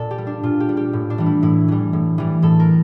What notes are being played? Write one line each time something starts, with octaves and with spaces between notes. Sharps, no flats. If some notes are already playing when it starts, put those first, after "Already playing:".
Already playing: A#2 A4 D5
G4
G3
D4
A#2 F4
G4
G3
G4
A2
D4
E3 G3
E4
A2 E4
E3 G3
A2
E3 G3
A2 A4
A#4